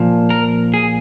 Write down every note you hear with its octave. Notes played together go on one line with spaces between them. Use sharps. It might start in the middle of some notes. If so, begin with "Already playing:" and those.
Already playing: A#2 F3
A#4
G#4